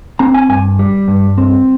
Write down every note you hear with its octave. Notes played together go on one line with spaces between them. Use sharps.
C4 A#5
G#5
G2 G#5
G3
G2
C4